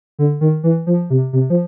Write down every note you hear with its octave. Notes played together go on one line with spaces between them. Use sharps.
D3
D#3
E3
F3
C3
C3
F3